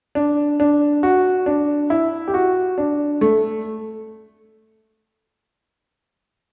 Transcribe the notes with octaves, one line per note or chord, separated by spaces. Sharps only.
D4
D4
F#4
D4
E4
G4
F#4
D4
A3